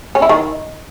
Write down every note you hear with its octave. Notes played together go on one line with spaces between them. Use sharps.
C#4
E4
D#3